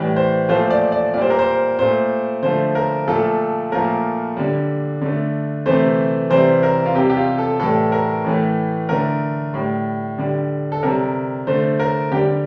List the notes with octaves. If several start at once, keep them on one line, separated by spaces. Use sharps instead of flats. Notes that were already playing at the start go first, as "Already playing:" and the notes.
Already playing: A2 E3 G3
C5
A#2 F3 A3 C5
D5
D5
A#2 G3 C5 D5
A#4
C5
A#2 A3 C5
D3 F3 A3 C5
A#4
A#2 F3 A3 A4
A#2 F3 A3 A#4
D3 G3
D3 A3
C3 E3 A3 C5
C3 E3 G3 C5
A#4
F4
C3 G3 G4
G4
F4
A4
A2 E3 G3 A4
A#4
A2 E3 A3
D3 A3 A#4
A2 G3
D3 G3
A4
C3 G3 A#4
D3 A3 C5
A#4
D3 G3 G4